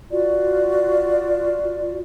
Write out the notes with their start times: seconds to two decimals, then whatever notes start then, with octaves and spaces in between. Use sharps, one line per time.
0.10 F4 F#4 D5